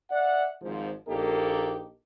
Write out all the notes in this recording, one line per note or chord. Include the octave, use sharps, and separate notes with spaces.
D5 E5 F#5
G#1 G#2 F3
A#1 A#3 D#4 G4 A4